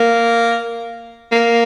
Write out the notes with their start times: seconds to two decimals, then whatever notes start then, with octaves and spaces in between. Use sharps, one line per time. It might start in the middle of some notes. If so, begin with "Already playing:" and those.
Already playing: A#3
1.32 A#3